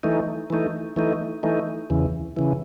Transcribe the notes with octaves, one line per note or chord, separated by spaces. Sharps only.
E3 A3 D#4
E3 A3 D#4
E3 A3 D#4
E3 A3 D#4
E2 C#3 E3
C#3 E3